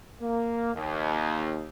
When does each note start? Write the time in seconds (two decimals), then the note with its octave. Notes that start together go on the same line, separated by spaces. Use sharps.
0.21 A#3
0.74 D#2